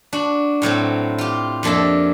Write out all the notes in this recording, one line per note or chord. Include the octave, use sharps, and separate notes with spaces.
D4 F#4
A2 F#3 A3 C4
F4 G4
F2 A#3 D4 A4 E5